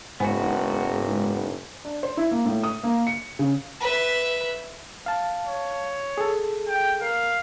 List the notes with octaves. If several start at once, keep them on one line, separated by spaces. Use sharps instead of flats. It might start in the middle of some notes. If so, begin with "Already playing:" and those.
F#1 G#2 B3 F#4 C5 G#5
D4
C5
E4
A#3
A2
D#6
A#3
C#7
C#3
B4 E5
F5 A5
C#5
G#4 A4
G5
A#4 F5